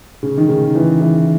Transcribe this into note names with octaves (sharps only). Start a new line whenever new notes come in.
C#3
D#3
C#3
E3
E3